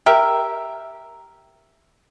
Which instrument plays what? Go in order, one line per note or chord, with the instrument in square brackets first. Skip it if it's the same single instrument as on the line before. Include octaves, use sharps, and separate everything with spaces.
[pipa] G4 A#4 E5